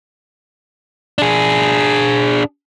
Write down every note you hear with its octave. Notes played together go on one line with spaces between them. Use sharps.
D4 G#4